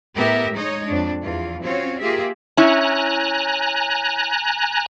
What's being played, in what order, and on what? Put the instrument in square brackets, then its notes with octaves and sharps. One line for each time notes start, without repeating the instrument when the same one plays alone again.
[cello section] A2 B3 G4 A#4 E5
G#3 D#4 C#5 D#5
F2 D4
E2 E3 F4
C4 C#4 F4 F#4 C#5
A#3 F4 G4 G#4 E5
[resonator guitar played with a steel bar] C#4 E4 [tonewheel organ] G#5 A#5 F#6